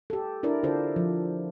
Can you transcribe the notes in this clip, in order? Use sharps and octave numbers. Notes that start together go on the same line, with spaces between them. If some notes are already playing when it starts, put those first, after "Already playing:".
G4 A4
D4 E4 A#4 D5
D3 D4 F4 A4 C5
F3